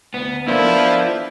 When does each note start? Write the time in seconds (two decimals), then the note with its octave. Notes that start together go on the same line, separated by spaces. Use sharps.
0.14 D2 B3
0.48 B3 D4 E4 F4 A4 A#4 C5